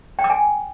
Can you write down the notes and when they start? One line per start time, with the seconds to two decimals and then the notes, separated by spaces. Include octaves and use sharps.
0.19 G5
0.24 D6
0.30 G#5